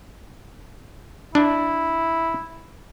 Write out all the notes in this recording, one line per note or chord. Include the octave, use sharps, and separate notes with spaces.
D4 E4